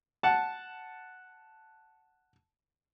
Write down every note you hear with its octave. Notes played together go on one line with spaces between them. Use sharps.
F#5 A5